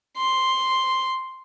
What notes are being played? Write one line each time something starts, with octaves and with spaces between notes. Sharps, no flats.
C6